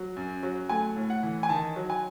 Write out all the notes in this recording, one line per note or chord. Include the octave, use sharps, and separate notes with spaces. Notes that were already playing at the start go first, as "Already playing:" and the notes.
Already playing: F#3
F#2
F#3
A3 G#5
A2
F#5
E3
G#5
D#3 A5
F#3
G#5